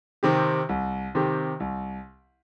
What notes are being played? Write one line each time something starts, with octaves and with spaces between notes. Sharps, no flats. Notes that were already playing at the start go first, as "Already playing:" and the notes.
C3 D#3 C4 G4
C2
C3 D#3 C4 G4
C2